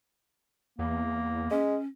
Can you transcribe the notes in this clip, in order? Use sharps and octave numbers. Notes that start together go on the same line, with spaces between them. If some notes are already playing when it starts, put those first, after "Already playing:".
E2 A#3
G#3 C#4